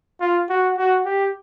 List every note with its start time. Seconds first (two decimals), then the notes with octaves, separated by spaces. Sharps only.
0.20 F4
0.49 F#4
0.77 F#4
1.05 G4